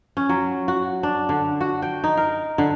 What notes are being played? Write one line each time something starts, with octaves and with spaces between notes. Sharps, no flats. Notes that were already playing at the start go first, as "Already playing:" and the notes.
C#4
F#3
F#4
D4
D3
F#4
G5
D#4
A#4
D3